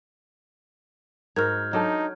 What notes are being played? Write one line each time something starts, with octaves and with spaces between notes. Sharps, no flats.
G#2 F#4 A#4 F6 G6 G#6
F#3 D4 D#4 A4 A5